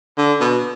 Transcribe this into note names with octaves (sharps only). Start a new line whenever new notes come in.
D3
B2